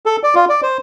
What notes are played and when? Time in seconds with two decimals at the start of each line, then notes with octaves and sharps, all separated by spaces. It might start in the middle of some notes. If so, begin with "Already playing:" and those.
0.06 A4
0.23 D5
0.35 F4
0.49 D5
0.63 C5